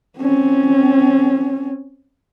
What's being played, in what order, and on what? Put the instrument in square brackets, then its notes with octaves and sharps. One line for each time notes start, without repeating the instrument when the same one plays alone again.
[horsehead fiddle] C4 C#4